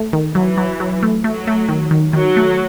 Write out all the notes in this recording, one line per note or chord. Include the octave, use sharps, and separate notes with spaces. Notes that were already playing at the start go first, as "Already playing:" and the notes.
Already playing: A3
D#3
E3 F#3
F#3
F#3
A3
F#3 A3
A3
D#3
D#3
D#3 F#3
A3